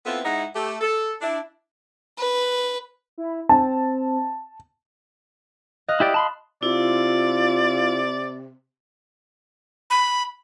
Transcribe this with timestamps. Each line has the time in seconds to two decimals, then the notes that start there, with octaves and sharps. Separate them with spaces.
0.06 B3 C4 E4 F4 A4 B4
0.25 G#2 D#4 E4 D#5 F#5
0.56 A3 G4 A4
0.81 A4
1.22 D4 E4
2.18 B4
3.18 E4
3.49 C4 A5
5.88 D#5 F5 F#6
6.00 E4 G4 D5
6.14 A5 B5 C6
6.63 C3 E4 F4 D5
9.90 B5